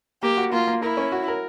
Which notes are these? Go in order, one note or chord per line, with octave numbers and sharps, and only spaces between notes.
A#3 G4
F#4
A#3 F4
A#3
E4 A#4
C#4
F#4
A#4